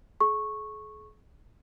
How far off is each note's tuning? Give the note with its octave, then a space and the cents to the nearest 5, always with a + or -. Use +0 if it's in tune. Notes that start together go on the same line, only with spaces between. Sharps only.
G#4 +45 C#6 -10